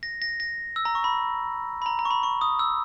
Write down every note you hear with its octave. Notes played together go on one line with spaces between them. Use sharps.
A#6
A#6
A#6
E6
A#5
C#6
B5
B5
A#5
A#5
C#6
B5
C#6
D#6
E6